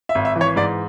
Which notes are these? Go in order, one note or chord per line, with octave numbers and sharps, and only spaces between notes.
E5
G#1
E5
E3
C#5
G#2 D5